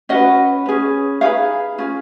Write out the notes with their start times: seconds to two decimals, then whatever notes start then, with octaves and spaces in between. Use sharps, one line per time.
0.09 C#4 F#4 B4 D#5 F#5
0.66 C#4 G#4 B4
1.21 D#4 G#4 B4 C#5 F5
1.78 C#4 F4 G#4